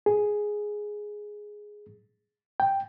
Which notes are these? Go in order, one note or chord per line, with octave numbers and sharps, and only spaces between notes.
G#4
G5